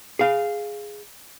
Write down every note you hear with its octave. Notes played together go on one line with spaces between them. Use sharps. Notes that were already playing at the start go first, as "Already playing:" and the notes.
G#4 F5